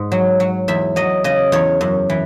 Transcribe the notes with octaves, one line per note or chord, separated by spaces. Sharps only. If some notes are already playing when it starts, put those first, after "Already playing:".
Already playing: G#2
F#3
F#3
E2 E5
F#3 D#5
C#3 D#5
E2 C#5
F#2
E3